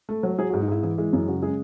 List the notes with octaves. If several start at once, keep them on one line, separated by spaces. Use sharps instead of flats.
A3
F#3
F#3 G#4
F#4
G#2
D#4
G#2 E4
E3 E4
G#3 E4
F#2 E4
C#3 F#4
G#3 G#4